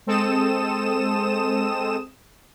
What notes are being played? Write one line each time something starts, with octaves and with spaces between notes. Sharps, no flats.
G#3 C4 A4 D#6 E7